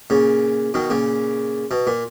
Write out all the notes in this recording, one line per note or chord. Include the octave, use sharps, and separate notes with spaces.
A#2 C#3
B2 D#3
A#2 C#3
B2
A#2